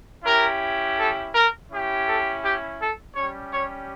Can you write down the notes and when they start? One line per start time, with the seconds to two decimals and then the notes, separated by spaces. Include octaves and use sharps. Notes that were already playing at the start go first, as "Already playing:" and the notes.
0.24 C#4 E4 G4 A#4
0.98 A4
1.33 A#4
1.71 C#4 E4 G4
2.07 A4
2.43 G4
2.80 A4
3.15 G3 C#4 G4 C#5
3.52 C#5